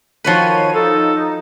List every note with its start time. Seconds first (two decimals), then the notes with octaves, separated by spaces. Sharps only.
0.24 D#3 F3 F#4 B4 C#5 D#7
0.75 D#4 A4